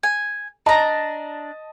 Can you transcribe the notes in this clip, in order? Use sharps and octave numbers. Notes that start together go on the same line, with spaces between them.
G#5
D4 D#5 A5 A#5